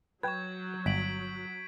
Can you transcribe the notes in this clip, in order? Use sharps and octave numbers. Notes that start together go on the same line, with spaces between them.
F#3 B4 G5 C#6 G6 G#6
G1 B6 D7 F#7